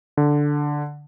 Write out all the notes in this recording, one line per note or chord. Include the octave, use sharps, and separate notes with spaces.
D3